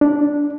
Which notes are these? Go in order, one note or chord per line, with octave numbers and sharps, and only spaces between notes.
D4